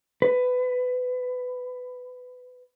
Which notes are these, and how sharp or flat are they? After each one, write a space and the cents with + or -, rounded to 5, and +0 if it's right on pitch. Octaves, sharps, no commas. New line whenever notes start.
B4 +20